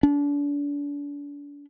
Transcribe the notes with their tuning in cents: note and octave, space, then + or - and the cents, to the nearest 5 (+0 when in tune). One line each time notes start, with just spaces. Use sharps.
D4 -35